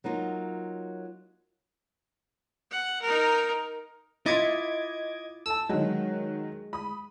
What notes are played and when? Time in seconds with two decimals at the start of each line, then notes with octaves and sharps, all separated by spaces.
0.04 F#3 A#3 D#4 F4
2.71 F#5
3.02 D#4 A#4
4.26 E4 F4 D#5 D6 G#6 A6 B6 C#7
5.46 A4 A5 E6
5.69 D#3 F#3 G#3
6.73 B5 D#6